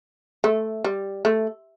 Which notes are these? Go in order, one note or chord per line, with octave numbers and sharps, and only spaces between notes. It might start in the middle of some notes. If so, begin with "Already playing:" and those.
A3
G3
A3